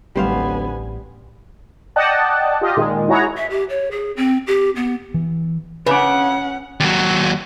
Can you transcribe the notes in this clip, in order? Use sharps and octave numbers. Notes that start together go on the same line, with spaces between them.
D1 A1 G3 B3 C5 F5 G#5
D5 D#5 F#5 G5 A5
F4 G4 D#5
A#2 D#3 G#3
E4 F#4 G#4 C#5 A#5
E5
G4
C#5
G#4
C4
G4
B3
E3
C#3 C#4 B4 F#5 D6
D#2 F#3